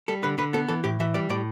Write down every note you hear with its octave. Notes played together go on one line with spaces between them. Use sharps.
G3 A4
D3 B4
D3 B4
B3 A4
E3 A4
A2 G4
E3 E5
G3 D5
A2 D5